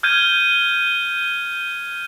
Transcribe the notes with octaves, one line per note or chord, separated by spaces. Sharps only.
F6 G6 G#6 D#7